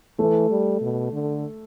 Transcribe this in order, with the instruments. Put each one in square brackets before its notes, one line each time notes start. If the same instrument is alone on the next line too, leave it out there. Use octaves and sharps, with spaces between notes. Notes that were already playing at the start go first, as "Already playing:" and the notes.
[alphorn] E3 [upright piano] A3
[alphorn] G3
B2
D3